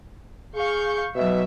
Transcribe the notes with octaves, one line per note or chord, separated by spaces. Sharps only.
G#4 F5 C#6 G6
B2 F#3 E5